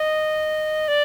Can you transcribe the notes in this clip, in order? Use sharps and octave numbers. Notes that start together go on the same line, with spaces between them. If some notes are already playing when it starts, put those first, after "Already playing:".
Already playing: D#5
D5